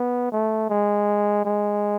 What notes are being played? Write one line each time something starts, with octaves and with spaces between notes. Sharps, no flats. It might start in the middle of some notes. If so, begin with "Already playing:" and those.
Already playing: B3
A3
G#3
G#3